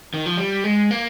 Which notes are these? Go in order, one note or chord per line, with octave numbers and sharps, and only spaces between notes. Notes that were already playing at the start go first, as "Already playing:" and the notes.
D#3
F3
G3
G#3
A#3